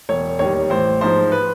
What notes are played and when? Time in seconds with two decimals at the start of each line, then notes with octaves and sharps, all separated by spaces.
0.09 E1 C#5
0.39 D#2 D#3 G3 C#5
0.70 A1 C5
1.01 G#2 F3 C5
1.32 B4